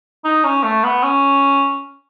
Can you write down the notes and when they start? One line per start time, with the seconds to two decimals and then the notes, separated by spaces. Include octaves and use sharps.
0.25 D#4
0.44 C#4
0.64 A3
0.84 B3
1.03 C#4